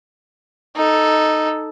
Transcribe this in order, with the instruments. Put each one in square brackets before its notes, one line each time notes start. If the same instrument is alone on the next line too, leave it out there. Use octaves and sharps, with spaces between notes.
[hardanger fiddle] D#4 A4